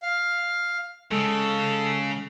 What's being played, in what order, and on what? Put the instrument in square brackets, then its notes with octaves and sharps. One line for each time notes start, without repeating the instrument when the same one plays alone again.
[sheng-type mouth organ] F5
[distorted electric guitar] C#3 [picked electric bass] G#3 [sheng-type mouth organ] A4